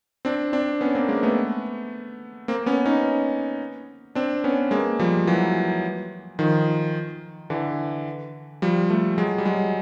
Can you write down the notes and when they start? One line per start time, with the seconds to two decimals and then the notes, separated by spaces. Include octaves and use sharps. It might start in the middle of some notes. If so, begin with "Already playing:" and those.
0.25 C4 D4
0.53 C4 D4
0.81 B3 C#4
0.95 A#3 C4
1.08 G#3 A#3
1.23 A3 B3
2.48 A#3 C4
2.66 B3 C#4
2.85 C#4 D#4
4.15 C4 D4
4.44 B3 C#4
4.71 G#3 A#3
4.99 F3 G3
5.27 E3 F#3
6.39 D#3 F3
7.50 D3 E3
8.62 F3 G3
8.90 G3 A3
9.18 F#3 G#3
9.38 G3
9.45 F#3 G#3